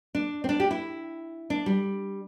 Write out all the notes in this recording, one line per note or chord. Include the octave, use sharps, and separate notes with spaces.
D4
C4
D4
G4
E4
D4
G3